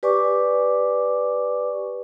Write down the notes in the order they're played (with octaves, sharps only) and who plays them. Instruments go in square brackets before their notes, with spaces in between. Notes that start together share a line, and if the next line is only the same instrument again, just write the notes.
[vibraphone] G4 B4 D5 G#5 C#6 D6